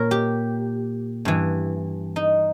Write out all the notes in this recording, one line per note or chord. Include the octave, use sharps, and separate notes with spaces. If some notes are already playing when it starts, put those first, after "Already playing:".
Already playing: A#2 A#4 C#5
G4
G2 E3
D#4